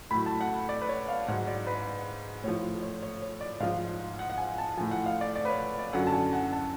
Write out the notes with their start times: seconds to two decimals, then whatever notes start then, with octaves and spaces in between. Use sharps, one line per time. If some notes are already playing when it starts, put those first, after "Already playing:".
0.11 A2 F#3 B5
0.26 A5
0.41 F#5
0.69 D5
0.82 B4
0.89 C#5
1.08 F5
1.27 G#2 F#3 F#5
1.47 D5
1.67 B4
2.44 A2 F3 C#5
2.82 C#5
3.02 C#5
3.22 C#5
3.41 D5
3.60 G#2 F3 F5
4.19 F#5
4.30 F#5
4.38 G#5
4.58 A5
4.77 A2 F3 G#5
4.91 F#5
5.06 F5
5.21 D5
5.35 D5
5.45 B4
5.50 C#5
5.79 D5
5.93 F#2 D3 F#3 F#5
6.07 A5
6.13 G#5
6.33 F#5
6.52 A5